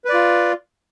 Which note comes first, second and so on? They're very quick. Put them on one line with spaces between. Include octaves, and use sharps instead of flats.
B4 D5 F4